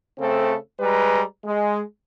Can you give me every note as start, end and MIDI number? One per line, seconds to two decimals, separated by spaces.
0.19 0.56 49
0.19 0.56 57
0.19 0.56 60
0.19 0.56 69
0.80 1.21 55
0.80 1.21 56
0.80 1.21 71
0.80 1.21 82
1.45 1.81 56